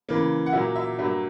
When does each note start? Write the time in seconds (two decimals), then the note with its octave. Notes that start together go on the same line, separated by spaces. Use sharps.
0.09 C#3 E3 A#3
0.46 F#5
0.53 A#2 F#3 A#3 E5
0.75 E5
0.98 G2 F#3 A#3 E5